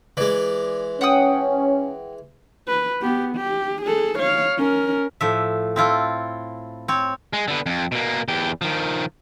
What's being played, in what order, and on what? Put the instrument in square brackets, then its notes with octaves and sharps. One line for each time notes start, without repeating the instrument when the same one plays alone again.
[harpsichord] E3 G#3 [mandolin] D5
[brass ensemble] C#4 [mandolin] F#5 G5 D#6
[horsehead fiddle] B4
B3 G4
G4
G#4 A4
C#5 F5
C#4 A#4
[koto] A2 F3 E5
C4 E4 F4 A4
C4 C#5
[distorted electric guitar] G#3
D3 B3
F2
B2 A#3
E2 G4
D#3 F3